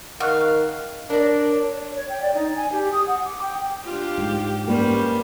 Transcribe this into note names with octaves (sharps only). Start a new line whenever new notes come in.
D#3 F5 F#5 C#6 F#6
D4 A#4 C#5 D5
C#5
G5
D5
D#4
G#5
G4
D#6
F#5
D6
G5
D4 F4 G4
G#2
G3 A#3 C#4 B4 C5